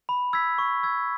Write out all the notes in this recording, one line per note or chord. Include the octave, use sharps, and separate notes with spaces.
B5
E6 G#6 B6
C#6
E6 G#6